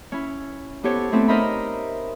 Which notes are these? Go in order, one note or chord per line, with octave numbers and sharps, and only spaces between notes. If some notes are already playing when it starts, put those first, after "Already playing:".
C#4 E4
B3 E4 G4 A4 C5 C#5
A3 B3 C4 D4 E4 A4
D#4 A#4 C5 D#5 E5 B5